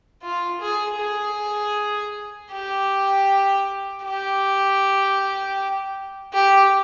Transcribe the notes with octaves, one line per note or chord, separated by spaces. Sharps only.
F4
G#4
G#4
G4
G4
G4